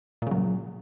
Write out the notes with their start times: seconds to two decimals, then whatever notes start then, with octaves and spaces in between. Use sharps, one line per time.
0.22 A#2
0.27 C#3
0.31 F#3